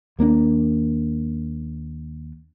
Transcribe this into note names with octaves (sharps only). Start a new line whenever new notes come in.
D#2 A#3 B3 D4